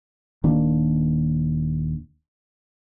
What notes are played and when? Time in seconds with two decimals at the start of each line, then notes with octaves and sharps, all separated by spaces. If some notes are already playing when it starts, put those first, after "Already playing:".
0.44 D#1 D#3 A#3 D4